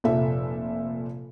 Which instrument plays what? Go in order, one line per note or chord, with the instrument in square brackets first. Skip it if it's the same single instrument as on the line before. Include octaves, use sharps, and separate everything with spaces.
[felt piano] F1 A#2 F3 A4 E5